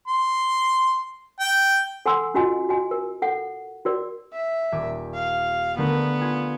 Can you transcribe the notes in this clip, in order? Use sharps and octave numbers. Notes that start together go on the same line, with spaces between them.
C6
G5
A4 F#5 G#5 A#5 C6 E6
C#4 F4 F#4 D#5 G#5
F#4 D#5 G#5
A#4
A4 F#5
F#4 A#4 D5
E5
D#1 G#5 D6
F5
D3 A3 B3 A#4
F4 G#5 G#6